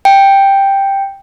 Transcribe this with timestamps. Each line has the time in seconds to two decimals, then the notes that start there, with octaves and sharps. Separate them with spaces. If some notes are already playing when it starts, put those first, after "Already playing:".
0.05 G5